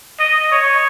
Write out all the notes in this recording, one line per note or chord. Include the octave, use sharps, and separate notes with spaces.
D#5
C#5